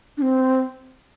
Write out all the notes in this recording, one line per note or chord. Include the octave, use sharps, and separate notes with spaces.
D4
C4